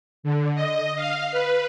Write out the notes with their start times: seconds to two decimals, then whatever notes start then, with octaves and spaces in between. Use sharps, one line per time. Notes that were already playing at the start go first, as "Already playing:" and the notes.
0.23 D3
0.55 D#5
0.96 F5
1.31 B4